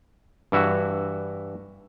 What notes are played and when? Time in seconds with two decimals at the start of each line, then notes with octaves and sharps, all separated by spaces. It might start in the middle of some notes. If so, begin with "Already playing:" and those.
0.52 G2 E3 E4 F#4